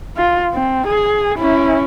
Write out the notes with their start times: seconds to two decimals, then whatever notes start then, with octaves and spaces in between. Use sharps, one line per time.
0.17 F4
0.53 C4
0.87 G#4
1.38 C#4 E4